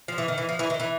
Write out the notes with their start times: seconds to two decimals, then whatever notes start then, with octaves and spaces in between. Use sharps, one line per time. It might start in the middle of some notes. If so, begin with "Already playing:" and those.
0.08 F3
0.18 E3
0.28 D#3
0.38 E3
0.49 F3
0.59 E3
0.70 D#3
0.80 E3